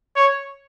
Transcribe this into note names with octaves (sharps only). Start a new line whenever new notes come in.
C#5